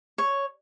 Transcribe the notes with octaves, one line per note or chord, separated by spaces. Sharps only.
C#5